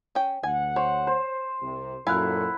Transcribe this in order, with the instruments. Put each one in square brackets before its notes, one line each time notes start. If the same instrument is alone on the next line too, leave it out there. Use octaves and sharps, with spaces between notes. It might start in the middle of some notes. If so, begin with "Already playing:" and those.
[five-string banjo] C#4 G5
[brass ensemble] D2 F#5 [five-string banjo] G#5
[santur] C5 [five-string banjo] C#5
[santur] C5
[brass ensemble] C2 C3
[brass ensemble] F#2 A#2 A4 [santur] E4 F#5 [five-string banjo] A#4 F5 G#5